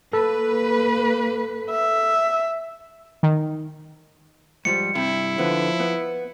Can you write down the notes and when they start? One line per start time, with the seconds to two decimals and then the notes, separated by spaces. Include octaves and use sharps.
0.13 A#3 A4 B4
1.70 E5
3.23 D#3
4.65 G#2 F3 G3 C#7
4.95 G2 C3 E4
5.38 D3 F3 B3
5.80 B3